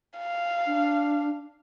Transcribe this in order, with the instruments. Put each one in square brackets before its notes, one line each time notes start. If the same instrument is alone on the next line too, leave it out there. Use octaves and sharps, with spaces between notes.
[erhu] F5
[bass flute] D4